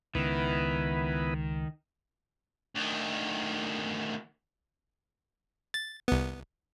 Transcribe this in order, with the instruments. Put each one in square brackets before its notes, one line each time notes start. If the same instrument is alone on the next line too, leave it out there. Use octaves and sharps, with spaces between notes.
[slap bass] C#2 [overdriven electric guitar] D#3 [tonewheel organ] B3 E4 B4
[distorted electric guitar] D2 D#3
[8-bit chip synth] A6
C2 B3